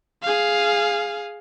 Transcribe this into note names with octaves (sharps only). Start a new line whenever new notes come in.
G#4 F5